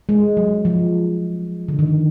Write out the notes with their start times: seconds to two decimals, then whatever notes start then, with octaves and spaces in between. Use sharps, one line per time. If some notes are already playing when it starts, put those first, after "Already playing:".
0.09 G#3
0.37 F#3
0.65 F3
1.68 D3
1.79 D#3